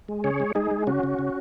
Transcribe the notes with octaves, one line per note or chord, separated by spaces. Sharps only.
G#3
C#3 G#4 C#5
G#3
G#3 D#4 G#4
G#3
C#3 C#4 F#4
C#3
C#3